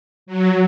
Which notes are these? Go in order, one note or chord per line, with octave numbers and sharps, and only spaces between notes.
F#3